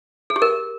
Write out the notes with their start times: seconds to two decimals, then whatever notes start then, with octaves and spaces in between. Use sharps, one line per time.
0.30 G#4
0.36 G4
0.42 A#4